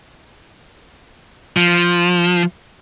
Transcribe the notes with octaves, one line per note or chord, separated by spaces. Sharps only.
F3